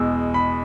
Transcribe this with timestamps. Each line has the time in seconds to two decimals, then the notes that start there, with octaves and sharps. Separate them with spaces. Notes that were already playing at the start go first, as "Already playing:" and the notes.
Already playing: E2 B2 G#3 E6
0.34 B5